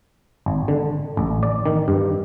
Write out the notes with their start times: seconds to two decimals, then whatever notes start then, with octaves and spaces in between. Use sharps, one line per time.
0.46 G#1
0.68 D3
1.17 A1
1.43 D5
1.66 D#3
1.88 G2